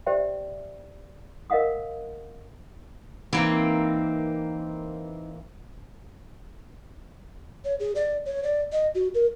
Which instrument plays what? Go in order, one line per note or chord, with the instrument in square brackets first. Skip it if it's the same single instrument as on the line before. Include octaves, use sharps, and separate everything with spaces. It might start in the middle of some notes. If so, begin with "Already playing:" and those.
[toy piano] G4 C5 D5 E5 G5
A#4 D#5 F5 F#5 D#6
[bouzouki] E3 A#3 C4 [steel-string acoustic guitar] D#4
[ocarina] C#5
G#4
D5
C#5
D5
D#5
F#4
A#4